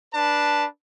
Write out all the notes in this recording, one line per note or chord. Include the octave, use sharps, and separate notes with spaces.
D4 B4 A5